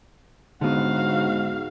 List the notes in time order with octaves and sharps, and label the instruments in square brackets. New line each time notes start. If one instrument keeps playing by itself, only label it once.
[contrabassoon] G#2 [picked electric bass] D3 B3 [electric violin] F#4 F5